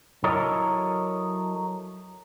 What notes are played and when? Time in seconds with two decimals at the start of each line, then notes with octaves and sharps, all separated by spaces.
0.24 F#3 E4 A4 A#4 C#5 D#5